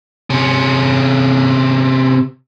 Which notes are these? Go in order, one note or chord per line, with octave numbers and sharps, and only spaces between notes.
C3 C#4